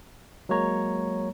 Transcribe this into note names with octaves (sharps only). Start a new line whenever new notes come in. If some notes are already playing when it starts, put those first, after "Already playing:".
F#3 G#3 A#3 C#5 A#5